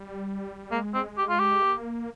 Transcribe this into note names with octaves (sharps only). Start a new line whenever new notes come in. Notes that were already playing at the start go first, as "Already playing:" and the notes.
Already playing: G3
G#3 A#3
C4
G4
F4
G4
A#3